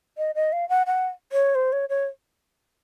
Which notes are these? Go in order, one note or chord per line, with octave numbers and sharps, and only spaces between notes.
D#5
D#5
F5
F#5
F#5
C#5
C5
C#5
C#5